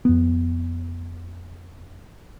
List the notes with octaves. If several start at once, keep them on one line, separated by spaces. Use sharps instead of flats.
F2 B3